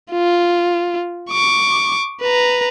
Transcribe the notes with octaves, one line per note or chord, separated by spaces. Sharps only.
F4
C#6 D6
B4 A#5